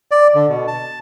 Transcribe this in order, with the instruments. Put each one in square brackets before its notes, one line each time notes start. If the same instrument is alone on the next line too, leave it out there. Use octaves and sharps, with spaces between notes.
[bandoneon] D5
D3
B2
A5